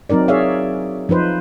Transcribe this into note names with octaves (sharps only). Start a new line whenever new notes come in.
F#3 C4 D#4 A#4 D5
G#4 C#5 D5 E5 F5
F3 D#4 B4 C5